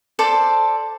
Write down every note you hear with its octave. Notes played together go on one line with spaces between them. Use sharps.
A4 C5 D5